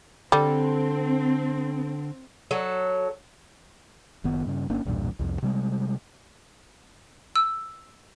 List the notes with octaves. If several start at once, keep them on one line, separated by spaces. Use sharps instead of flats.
D3 G3 C4 A4
F#3 A4
F#1 D#3 B3
G2 C#3
G1 A#3 C#4 D4
B1 E2 G2 A#2
C2 F2
C3 G3 G#3
E6